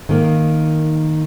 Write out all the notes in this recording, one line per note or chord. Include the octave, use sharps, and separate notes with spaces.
D#3 A#3